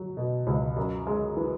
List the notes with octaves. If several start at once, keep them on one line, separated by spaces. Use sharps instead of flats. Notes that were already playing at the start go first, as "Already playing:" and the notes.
Already playing: F#3
B2
C#2
F#2
G#3
E3